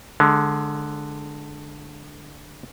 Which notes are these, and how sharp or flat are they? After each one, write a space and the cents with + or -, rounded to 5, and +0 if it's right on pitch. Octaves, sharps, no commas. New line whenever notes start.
D3 +5 G#3 +25